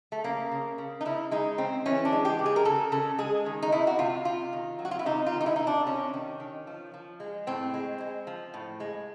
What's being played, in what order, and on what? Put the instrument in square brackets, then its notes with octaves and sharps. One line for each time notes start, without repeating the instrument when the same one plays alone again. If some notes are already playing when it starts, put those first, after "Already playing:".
[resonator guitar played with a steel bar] A3
C#3 A#3
C#3
C#3
D#4
C#3 E4
G#3 D#4
C#3 C4
E3 C#4
D4
G#3
G4
C#3
G#4
A#4
C#3 A4
C#3 A4
G#3 G#4
D#3
D#4
C3 E4
F#4
C3 F4
C3 F4
D#3
F#3
F#4
F4
E4
C3 D#4
F4
D#3
D#4
E4
C3 D#4
D4
C3 C#4
D#3
D#3
F3
F3
G#3
A2 C4
G#3
G#3
F3
A2
G#3